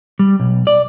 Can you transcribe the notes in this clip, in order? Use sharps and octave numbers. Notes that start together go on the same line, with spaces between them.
G3
B1
D5